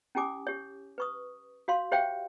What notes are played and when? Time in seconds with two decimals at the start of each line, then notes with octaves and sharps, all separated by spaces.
0.15 C#4 E4 G4 G#5 D6 D#6
0.47 G4 C#5
0.98 B4 C#6 D#6
1.68 F#4 C#5 F5 C6
1.92 G4 C5 C#5 E5 F5 G5